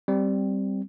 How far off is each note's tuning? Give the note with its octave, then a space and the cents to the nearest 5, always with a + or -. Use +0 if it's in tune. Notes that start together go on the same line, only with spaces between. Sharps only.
G3 +0 C4 +5